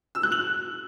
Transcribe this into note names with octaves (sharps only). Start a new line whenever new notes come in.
E6
F#6
F#7